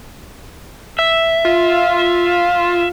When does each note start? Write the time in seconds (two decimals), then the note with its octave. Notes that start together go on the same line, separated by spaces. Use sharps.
0.99 E5
1.45 F4